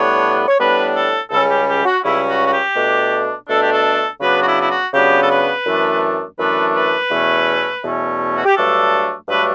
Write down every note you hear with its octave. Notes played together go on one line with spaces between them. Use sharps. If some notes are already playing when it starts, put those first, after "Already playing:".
Already playing: A2 G3 B3 D4 C#5
C#5
A2 G3 B3 D4 B4
A4
C#2 C#3 G3 C#4 A4
G4
G4
F#4
C#2 C#3 G3 C#4 E4
F#4
F#4
G4
B2 A3 D4
B2 A3 D4 A4
G4
A4
C#3 F#3 B3 D4 B4
F#4
E4
E4
F#4
C#3 F#3 B3 D4 G4
A4
B4
F#2 E3 A3 D4
F#2 E3 A3 D4 B4
B4
E2 B2 A3 C#4
E2 B2 A3 C#4
F#4
G4
G2 F#3 A3 D4 A4
G2 F#3 A3 D4 B4